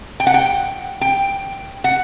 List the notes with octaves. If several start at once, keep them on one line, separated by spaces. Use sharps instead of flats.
G5
F#5
G5
G5
F#5